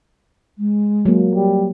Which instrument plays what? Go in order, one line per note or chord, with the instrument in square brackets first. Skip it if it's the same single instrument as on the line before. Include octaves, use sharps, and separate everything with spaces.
[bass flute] G#3
[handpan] F#3 A#3
[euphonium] G3